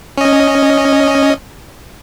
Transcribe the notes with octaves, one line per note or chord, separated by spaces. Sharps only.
C#4 D#5